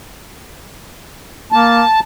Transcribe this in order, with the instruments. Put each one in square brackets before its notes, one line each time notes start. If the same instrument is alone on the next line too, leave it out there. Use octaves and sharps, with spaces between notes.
[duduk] A#3 [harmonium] A5